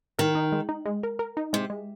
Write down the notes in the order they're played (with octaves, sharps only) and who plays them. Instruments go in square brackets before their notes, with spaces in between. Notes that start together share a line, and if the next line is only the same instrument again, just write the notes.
[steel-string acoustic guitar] D#3 [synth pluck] A#4
[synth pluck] D#4
G#3
D#4
G#3
A#4
A#4
D#4
[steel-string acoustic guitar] C3 [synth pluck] G#3
[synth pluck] G#3